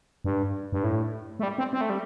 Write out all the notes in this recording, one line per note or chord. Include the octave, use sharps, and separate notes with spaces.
G2
G2
A2
A3
G3
C4
C4
A3
G3